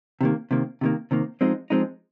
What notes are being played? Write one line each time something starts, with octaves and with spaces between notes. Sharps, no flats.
C3 D#3 A#3
C3 D#3 A#3
C3 D#3 A#3
C3 D#3 A#3
F3 G#3 C4 D#4
F3 G#3 C4 D#4